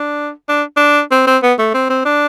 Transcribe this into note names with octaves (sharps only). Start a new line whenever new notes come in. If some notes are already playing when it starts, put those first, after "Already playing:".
Already playing: D4
D4
D4
C4
C4
B3
A3
C4
C4
D4